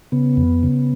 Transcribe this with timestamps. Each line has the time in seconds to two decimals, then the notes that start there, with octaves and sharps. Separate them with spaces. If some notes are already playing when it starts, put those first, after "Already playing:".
0.12 C#3 B3
0.37 F2
0.63 C#3